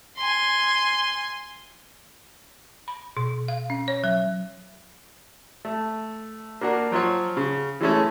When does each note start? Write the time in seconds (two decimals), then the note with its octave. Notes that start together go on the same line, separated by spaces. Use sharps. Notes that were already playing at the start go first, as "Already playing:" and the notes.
0.17 G#5 C6
2.88 B5
3.17 B2
3.48 F5
3.70 C#4
3.88 C#5
4.04 F#3
5.65 A3
6.61 A#3 D4 F#4 A#4
6.91 F3 F#3 F4 F#4 C#5
7.37 C#3
7.81 E3 G#3 A3 C#4